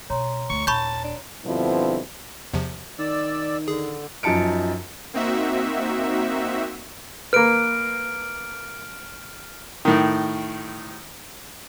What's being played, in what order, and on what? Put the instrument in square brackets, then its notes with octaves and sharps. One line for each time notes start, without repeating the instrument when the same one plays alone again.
[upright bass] B2 [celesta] C#5 A#5 C6
[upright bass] D2 [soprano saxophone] C#6
[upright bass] D#1 [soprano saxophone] A5 [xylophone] B5 C#6 G6
[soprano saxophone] D4
[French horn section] G2 B2 D3 F3 C4 E4
[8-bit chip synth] E2 C3 F3
[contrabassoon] D#3 [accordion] D5 E6
[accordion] D3 [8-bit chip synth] G#4
[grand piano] F#2 F3 D#4 A5 C#7 D7
[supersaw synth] A#3 C4 D#4 F#4 E5
[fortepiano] A#3 B4 [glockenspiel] F6 D7
[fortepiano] A2 D#3